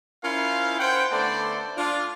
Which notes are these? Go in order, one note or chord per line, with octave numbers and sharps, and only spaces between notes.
C#4 E4 F4 A#4 C5 F5
C#4 C5 F#5 G5
D3 A3 B3 A4 C5 D5
D4 F4